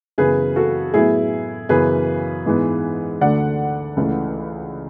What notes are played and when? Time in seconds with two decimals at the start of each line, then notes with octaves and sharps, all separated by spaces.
0.18 F#2 C#3 E3 B3 G#4 B4
0.56 F#4 A4
0.94 A2 F#3 B3 E4 G#4
1.69 F#2 C#3 E3 B3 G#4 B4
2.46 G#2 E3 G#3 B3
3.21 D2 D3 A3 D5 F#5
3.97 C#2 C#3 E3 A3